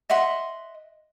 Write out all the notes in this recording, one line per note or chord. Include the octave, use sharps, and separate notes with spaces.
D#5 E5 F#5 C6